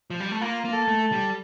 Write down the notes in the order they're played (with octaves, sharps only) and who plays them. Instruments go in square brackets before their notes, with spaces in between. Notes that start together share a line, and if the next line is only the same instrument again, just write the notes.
[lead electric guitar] F3
G3
A3
[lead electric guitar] A#3 [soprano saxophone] F4
[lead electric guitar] A#3
[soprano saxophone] A4
[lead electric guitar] A3
[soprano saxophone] A4
[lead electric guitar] G3